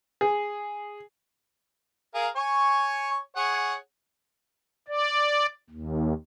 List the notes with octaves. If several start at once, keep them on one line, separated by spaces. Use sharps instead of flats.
G#4
G#4 A#4 F5
C#5 G#5 C#6
G#4 C#5 F#5
D5
D#2